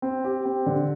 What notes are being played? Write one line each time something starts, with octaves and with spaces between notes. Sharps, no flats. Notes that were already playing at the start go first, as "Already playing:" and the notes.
C4
G4
C4
D3